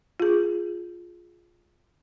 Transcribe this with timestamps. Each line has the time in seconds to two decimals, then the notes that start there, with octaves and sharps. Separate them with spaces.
0.20 F4 G#4